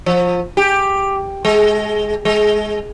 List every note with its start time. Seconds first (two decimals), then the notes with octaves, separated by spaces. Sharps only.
0.06 F3
0.57 G4
1.45 G#3
2.25 G#3